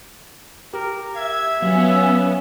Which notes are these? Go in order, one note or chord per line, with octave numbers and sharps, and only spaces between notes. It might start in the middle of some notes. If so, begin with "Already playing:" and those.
G4 A#4
E5 G#6
F#3 B3 C#4 F5